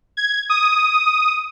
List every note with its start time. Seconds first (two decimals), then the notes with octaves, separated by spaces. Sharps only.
0.17 G#6
0.49 D#6